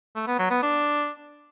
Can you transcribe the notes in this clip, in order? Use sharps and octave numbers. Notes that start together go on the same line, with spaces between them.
A3
B3
F#3
B3
D4